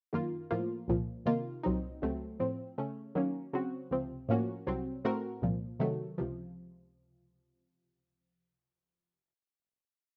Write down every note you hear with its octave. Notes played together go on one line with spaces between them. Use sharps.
F#2 D#3 A#3 F4
A2 F3 A#3 F4
C2 A#2 F3
C3 D#3 A#3 F4
C2 A#2 F#3 C4 D#4
C#2 C3 F#3 A3 C4
A2 F3 C4
C#3 A3 C#4
D#3 F#3 A#3 C#4
C#3 F#3 C4 F#4
C#2 C3 F3 C4
A2 F3 A#3 C#4 F#4
C2 C3 F#3 C4
A2 A3 C4 F#4 A#4
C2 A#2 F3
C3 D#3 F#3 A3
C#2 C3 F3